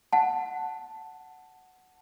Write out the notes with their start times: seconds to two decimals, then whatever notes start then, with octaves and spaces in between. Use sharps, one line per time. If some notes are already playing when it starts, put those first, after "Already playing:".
0.13 F#5 A5